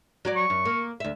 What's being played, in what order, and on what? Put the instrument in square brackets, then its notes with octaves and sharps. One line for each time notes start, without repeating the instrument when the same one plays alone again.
[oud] F#3 F#4 D5
[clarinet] C#6
[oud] F#2
A#3
D2 E5